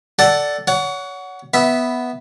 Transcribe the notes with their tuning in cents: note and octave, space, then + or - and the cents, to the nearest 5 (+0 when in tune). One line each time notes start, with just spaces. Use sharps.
A4 +0 D5 +0 F#5 +15
C#5 +30 F#5 +0
B3 +0 E5 -10